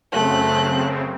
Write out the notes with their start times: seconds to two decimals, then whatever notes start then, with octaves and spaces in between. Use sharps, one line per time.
0.12 F#2 C#3 A3 C4 F#6